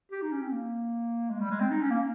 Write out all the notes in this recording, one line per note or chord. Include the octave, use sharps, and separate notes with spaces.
G4
D#4
C#4
C4
A#3
G#3
G3
G#3
C4
D#4
C#4
A#3